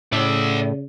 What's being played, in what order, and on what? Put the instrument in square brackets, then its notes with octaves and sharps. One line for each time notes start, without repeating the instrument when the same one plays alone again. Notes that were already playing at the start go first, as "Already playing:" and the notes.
[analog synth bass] A2 [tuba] C#3 [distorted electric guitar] D5 E5